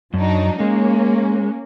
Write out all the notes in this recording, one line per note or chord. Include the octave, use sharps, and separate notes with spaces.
F#2 F#3 D4 D#4
G#3 A#3 C#4